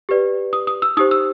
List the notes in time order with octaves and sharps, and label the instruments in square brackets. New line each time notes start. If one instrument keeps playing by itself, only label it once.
[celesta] G4 B4 D5
D#6
D#6
E6
D#4 G4 C5 D#6
E6